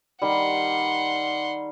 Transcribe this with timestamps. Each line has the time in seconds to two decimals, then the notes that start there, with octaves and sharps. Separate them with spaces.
0.22 D#3 G3 F#5 C6